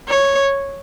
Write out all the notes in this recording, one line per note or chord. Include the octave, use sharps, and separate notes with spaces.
C#5